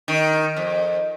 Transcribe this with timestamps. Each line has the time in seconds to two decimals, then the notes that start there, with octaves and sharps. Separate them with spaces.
0.08 D#3
0.56 F2